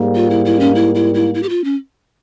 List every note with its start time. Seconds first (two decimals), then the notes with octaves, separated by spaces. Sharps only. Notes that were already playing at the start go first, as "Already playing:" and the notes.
Already playing: G#2 G3 A#3
0.15 F4
0.30 E4
0.45 E4
0.60 C#4
0.75 E4
0.95 E4
1.14 E4
1.34 E4
1.43 G4
1.49 F4
1.64 C#4